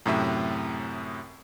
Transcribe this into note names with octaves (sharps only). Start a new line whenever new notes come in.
F#2 A2 C3 E5